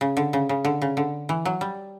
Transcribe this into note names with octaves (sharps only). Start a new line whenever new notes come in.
C#3
D3
C#3
C#3
D3
C#3
D3
E3
F#3
G3